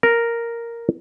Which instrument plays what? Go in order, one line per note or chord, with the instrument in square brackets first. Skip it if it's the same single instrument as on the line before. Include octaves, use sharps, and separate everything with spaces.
[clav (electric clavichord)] A#4